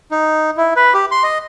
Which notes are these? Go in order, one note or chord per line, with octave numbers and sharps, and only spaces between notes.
D#4
E4
B4
G4
C6
D#5